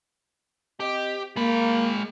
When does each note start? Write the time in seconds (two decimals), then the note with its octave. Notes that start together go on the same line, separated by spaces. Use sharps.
0.80 C4 G4 D#5
1.36 G#3 A#3 B5